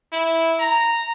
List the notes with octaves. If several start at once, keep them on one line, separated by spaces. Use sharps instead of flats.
E4
A#5